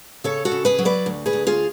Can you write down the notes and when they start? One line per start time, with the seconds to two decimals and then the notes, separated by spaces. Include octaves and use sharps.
0.24 C#3 A4 C#5
0.45 F#4 A4
0.52 C#3
0.65 G#4 B4
0.79 F#3
0.85 B4 D5
1.06 D2
1.26 G#4 B4
1.33 D2
1.47 F4 G#4